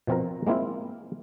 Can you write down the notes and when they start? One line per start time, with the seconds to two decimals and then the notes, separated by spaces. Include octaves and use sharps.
0.07 B2 F3 C4 F4 A#4
0.47 G#3 A#3 C4 E4 F4